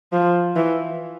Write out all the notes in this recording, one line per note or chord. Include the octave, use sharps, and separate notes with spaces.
F3
E3